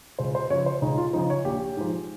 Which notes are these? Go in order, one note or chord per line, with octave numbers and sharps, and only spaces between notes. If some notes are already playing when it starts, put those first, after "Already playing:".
C#2 C5
C5
C#3 F3 C#5
C5
C#2 D#4
F4
C#3 F3 D#4
C#5
A#1 G4
G#2 F3